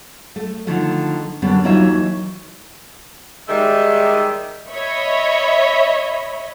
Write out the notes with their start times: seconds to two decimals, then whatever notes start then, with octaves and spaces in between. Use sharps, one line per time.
0.36 A3
0.67 D3 D#3 F3 A3
1.42 F#2 D3 G3 B3 C4 D4
1.64 D#2 E3 F#3 D#4 F4 E5
3.48 D#3 G3 G#3 E5
4.70 C#5 D#5 E5 B5